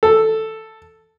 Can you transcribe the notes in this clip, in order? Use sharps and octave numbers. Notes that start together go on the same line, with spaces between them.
A4